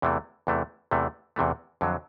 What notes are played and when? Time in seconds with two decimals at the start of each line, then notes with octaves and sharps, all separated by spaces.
0.02 E2 C3 E3 A3
0.47 E2 C3 E3 A3
0.91 E2 C3 E3 A3
1.36 E2 C3 E3 A3
1.81 F2 D3 F#3